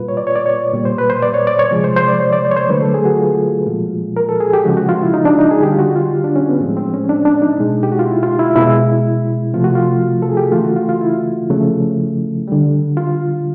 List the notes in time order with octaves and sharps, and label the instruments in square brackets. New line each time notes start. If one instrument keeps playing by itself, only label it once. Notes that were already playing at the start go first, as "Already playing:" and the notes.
Already playing: [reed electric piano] A#2 G3 F4 B4
C#5
D5
C#5
D5
C#5
A#2 G3
C5
B4
C5
D5
C#5
D5
C#5
C3 F3 G#3
C5
C5
D5
C#5
D5
C5
C#5
C5
D3 F#3 A3 B4
A4
G#4
F#4
F4
A#2 F3 G#3
A#4
A4
G#4
G4
C#3 F3 G#3 F#4
F#4
F4
E4
D#4
D4
D#4
G#4
D3 G3 G4
F4
F#4
F4
D4
C#4
B3
A2 F3 G#3 C4
C4
C#4
D4
D4
D#4
B2 G#3
G4
F#4
F4
E4
F4
E4
B2 G#3 E4
C3 F3 A3 F4
F#4
F4
A4
G#4
G4
F#4
C#3 E3 A3 F4
F#4
F4
F4
E4
C#3 F3 A3
D3 G3
F4